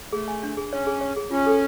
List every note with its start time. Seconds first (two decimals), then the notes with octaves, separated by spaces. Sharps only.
0.12 A3 G#4
0.28 G#5
0.43 D4
0.57 G#4
0.72 C#4 C#5
0.87 G#4
1.01 C#5
1.16 G#4
1.31 C#4 F4
1.46 A4